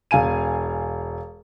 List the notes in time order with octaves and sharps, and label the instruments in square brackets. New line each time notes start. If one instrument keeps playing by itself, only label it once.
[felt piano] E1 F5 G#5 D#7